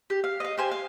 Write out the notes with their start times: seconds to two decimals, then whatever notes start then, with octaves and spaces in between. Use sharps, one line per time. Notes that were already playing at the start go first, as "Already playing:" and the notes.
0.10 G4
0.24 F5
0.40 D#5 F5
0.57 G4 C5 G#5
0.71 F5